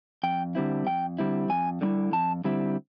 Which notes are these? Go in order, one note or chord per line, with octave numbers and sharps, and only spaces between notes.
F2 G5
D3 G3 C4 E4
F2 G5
D3 G3 C4 E4
F2 G#5
D3 G3 C4 E4
F2 A5
D3 G3 C4 E4